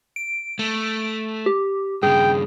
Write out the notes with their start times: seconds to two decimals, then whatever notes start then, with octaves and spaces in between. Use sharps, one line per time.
0.16 D7
0.59 A3
1.46 G4
2.03 G2 C#3 G#4 G5